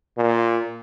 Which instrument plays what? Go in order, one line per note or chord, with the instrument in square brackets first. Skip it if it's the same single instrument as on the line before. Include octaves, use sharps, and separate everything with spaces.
[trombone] A#2